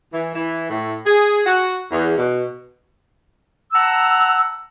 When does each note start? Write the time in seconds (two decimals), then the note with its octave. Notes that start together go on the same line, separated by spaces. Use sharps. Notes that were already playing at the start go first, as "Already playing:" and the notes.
0.13 E3
0.34 E3
0.70 A2
1.06 G#4
1.46 F#4
1.91 E2
2.18 B2
3.73 F#5 A5 A#5 E6